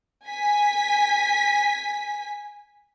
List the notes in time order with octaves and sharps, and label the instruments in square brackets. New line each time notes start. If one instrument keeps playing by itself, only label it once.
[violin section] G#5 B6